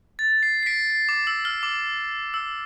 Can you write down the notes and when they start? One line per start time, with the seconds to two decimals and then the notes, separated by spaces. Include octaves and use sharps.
0.19 A6
0.43 C7
0.63 C7
0.66 B6 D7
0.90 C7
1.09 D6
1.27 E6
1.45 F6
1.63 D6
2.34 E6